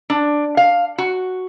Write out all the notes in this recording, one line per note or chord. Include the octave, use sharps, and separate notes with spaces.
D4
F5
F#4